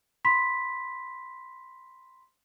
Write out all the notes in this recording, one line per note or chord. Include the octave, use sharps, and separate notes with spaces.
B5 C6 B6